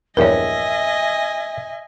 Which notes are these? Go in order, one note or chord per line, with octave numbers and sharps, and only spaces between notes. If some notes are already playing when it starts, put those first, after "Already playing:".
A#1 E2 G2 A#4 C#5 D#5 E5 G#5